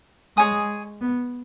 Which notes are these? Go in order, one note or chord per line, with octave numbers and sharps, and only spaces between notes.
G#3 G#4 C#5 G#5 D#6
B3